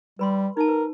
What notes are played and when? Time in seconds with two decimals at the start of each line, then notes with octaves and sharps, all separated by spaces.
0.19 G3 B4 B5 C6
0.57 D#4 A#4 A5
0.68 B4